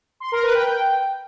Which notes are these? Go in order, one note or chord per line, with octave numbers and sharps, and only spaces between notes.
C6
A#4
B4
G5